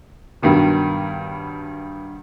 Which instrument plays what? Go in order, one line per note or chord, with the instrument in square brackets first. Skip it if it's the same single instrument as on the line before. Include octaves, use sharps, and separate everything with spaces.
[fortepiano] G2 B2 D#3 F#3